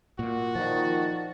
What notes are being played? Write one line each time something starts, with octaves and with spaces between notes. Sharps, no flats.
A#2 F#4
A#2 D#3 F3 A5